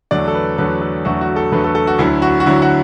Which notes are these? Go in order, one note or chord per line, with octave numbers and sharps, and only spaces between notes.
E2 D3 F#3 A3 D5
A4
B4
E2 D3 F#3 A3 B4
A4
E2 D3 F#3 A3 F#4
F#4
A4
E2 D3 F#3 A3 B4
A4
A4
F#4
D2 D3 F#3 E4
F#4
F#4
D2 D3 F#3 E4
F#4